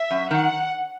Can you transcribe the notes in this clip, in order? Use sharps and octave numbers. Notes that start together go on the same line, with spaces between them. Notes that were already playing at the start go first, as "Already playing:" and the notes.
Already playing: E5
F#2
D#3 F#5